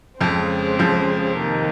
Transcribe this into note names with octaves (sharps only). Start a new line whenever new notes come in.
F2 C#3 F3 G#3 C4
F2 F3
C3 D#3 A#3 D#4